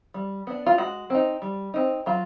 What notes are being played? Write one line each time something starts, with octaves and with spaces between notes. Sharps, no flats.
G3
B3 D4
F4
G#3 F#4
C4 D#4
G3
C4 D#4
F#3 F4